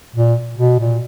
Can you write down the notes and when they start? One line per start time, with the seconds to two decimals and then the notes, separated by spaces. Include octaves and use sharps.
0.16 A#2
0.58 B2
0.80 A#2